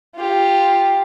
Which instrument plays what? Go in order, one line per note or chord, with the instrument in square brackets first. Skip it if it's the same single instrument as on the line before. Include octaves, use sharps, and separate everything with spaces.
[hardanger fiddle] F4 G4